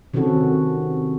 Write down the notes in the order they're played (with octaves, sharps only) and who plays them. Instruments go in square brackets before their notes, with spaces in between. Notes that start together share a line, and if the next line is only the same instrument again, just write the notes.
[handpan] C3 D#3 C4 C#4 F#4 A4